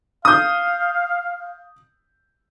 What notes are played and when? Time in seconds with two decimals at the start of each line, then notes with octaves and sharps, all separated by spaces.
0.25 F5 D#6 G6